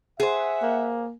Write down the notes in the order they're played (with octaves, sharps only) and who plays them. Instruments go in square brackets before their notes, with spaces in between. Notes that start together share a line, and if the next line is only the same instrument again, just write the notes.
[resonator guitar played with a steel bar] G#4 C5 [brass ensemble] E5 F#5
[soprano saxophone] A#3